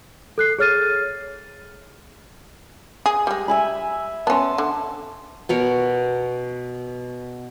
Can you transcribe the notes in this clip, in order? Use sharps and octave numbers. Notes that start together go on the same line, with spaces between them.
A4 F#6 C7
G#4 C#5 F6 A6 D#7
G#4
G3 G#3
E5 G#5 B5
B3 C#4 A5 C6
D3
B2 A#4 C#5